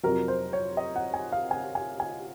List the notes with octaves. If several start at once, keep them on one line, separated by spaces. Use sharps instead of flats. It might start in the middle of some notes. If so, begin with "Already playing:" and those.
F2 C3 F#3 A#4
C5
C#5
D#5
F#5
G#5
F5
G#5
G#5
G#5